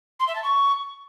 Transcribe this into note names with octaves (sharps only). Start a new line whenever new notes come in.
C6
E5
A5
C#6